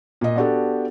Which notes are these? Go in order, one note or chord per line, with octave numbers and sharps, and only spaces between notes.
A#2 D#5
B3 D4 F#4 G4 A4